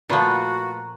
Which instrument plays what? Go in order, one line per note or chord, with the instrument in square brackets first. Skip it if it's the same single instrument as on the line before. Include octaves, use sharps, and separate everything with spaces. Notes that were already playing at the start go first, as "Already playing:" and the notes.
[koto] A#2 F3 [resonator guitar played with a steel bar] A3 F4 B4 [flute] F#4 [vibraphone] A#5